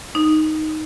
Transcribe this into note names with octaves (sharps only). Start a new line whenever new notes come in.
D#4